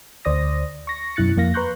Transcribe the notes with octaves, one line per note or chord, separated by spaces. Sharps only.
D2 C5 D5 D#6 A#6
C#6 A#6
F#2 B2 E4 F#6 A6 C#7
F2 A#3 F5 A#6
B4 A#5 C6 C#6 F#6 G6